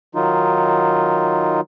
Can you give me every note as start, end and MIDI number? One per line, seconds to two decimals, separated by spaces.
0.15 1.61 51
0.15 1.61 54
0.15 1.61 63
0.15 1.61 65